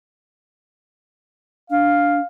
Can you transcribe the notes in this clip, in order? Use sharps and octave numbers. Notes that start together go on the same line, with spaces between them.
D4 F5